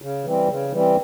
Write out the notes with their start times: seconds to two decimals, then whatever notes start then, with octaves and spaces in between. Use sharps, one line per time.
0.02 C#3
0.24 E3 G3 C4
0.48 C#3
0.73 E3 G3 C4